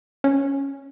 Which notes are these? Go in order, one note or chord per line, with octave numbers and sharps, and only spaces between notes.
C#4